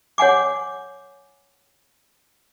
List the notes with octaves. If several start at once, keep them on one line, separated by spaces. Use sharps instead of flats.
C#5 F#5 G#5 D6